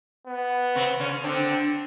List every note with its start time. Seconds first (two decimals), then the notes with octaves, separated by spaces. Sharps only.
0.27 B3
0.75 C3 C4
1.00 C#3 C#4
1.24 D3 C4 D4